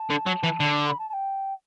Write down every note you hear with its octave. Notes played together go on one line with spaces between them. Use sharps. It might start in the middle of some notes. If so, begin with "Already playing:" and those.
Already playing: A5
D3
F#3
E3
D3
B5
A5
A5
G5